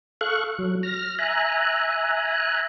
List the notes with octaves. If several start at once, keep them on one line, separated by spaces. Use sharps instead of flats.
A4 F5 C#6 F#6
F#3
F6 A#6
E5 G#5 A#5 F#6